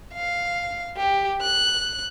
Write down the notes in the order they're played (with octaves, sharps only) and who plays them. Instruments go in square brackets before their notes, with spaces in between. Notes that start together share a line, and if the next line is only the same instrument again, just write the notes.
[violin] F5
G4
F#6